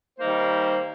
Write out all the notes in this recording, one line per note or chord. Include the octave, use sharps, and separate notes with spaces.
D#3 G3 A#3 D#4 C5